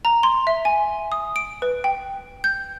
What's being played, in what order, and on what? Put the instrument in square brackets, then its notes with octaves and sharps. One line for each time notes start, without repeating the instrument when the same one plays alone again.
[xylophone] A#5
C6
E5
G#5
D#6
D7
B4
G5
G6